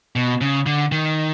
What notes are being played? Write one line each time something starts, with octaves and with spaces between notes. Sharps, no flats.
B2
C#3
D3
D#3